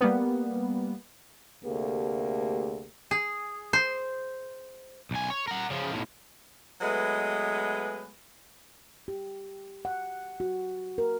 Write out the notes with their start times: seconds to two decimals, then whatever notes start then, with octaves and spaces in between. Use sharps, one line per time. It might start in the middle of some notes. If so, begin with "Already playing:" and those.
0.01 G3 A#3 B3
1.64 D2 C3 A3 A#3 G4 G#4
3.11 G#4
3.73 C5
5.11 B1 G#5
5.30 C#5
5.48 A#4 F#5
5.71 C#3 F3
5.92 B1 A2
6.80 F#3 G#3 A3 B3 B4 D#5
9.08 G4
9.85 F#5
10.40 F#4
10.98 A#4